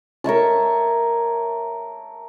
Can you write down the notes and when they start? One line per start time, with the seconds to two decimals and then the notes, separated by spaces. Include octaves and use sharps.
0.24 A#4 C#5 E5 A5